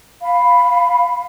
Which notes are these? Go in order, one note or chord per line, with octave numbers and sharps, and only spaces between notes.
F5 B5